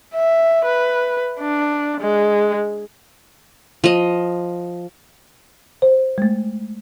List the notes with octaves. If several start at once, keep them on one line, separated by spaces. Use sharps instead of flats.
E5
B4
D4
G#3
F3 D#5
C5
G#3 A3